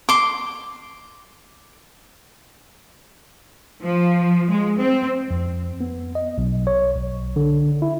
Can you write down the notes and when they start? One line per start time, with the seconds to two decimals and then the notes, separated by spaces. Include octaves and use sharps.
0.09 C6 D6
3.84 F3
4.50 G#3
4.80 C4
5.31 F2
5.81 B3
6.15 D#5
6.38 B1
6.67 C#5
6.96 B1
7.36 D3
7.82 E4